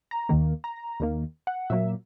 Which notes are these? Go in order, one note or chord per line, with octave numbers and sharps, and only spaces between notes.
A#5
D#2 D#3 A#3
A#5
D#2 D#3 A#3
F#5
A#2 F#3 A#3 E5